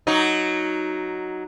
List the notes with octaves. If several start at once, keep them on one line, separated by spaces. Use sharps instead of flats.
F#3 D#4